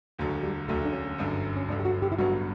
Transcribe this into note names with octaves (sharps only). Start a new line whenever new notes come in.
E1 D2 D3 F#3
G3
E1 D2 D3 F#3 A3
D4
C#4
G1 F#2 D3
C#4
G1 F#2 D3 D4
G4
F#4
G4
E4
A1 G2 D3 F#3 B3 F#4